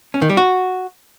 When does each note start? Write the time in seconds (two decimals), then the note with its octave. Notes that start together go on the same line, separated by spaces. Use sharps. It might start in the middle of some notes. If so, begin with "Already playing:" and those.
0.14 C#4
0.22 D#3
0.30 G3
0.37 F#4